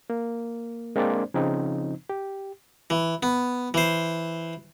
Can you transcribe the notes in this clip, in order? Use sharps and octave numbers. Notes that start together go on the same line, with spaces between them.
A#3
G#3 A#3 C4 D4 C5 D5
C#3 F3 C4 D#4
G4
E3
B3
E3 C5